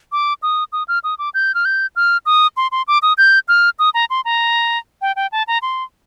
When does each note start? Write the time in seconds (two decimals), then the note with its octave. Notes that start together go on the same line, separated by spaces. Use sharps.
0.12 D6
0.43 D#6
0.73 D#6
0.88 F6
1.04 D#6
1.19 D6
1.34 G6
1.55 F6
1.65 G6
1.96 F6
2.26 D#6
2.57 C6
2.72 C6
2.88 D6
3.02 D#6
3.18 G6
3.48 F6
3.79 D#6
3.94 A#5
4.10 C6
4.25 A#5
5.02 G5
5.16 G5
5.32 A5
5.48 A#5
5.62 C6